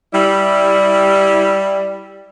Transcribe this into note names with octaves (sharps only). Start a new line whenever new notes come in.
G3 E4